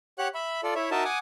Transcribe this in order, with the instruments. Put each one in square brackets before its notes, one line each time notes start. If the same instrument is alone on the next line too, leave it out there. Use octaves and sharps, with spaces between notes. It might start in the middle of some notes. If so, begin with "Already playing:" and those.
[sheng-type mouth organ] G4 C#5 F#5 F#6
E5 B5
F4 A4 D5
E4 C#5 E5
D#4 F#4 A#4 D#5 E5 A5
F#5 G#5 D6 D#6